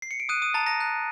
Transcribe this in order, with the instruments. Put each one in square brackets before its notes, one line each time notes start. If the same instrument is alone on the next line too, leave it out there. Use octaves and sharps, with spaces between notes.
[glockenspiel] C7
C#7
D7
D#6 F#6 D#7
D#6 D#7
A5 A#5 A6
A#5 A#6
F#6